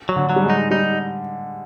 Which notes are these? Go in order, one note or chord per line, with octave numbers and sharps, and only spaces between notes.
F#3
D3
F#3
G3
G#3
D#4
G3 D#4